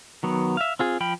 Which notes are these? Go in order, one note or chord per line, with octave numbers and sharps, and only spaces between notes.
D#3 F#3 B3
E5 F5
C4 F4 G#4
F3 F5 G5 B5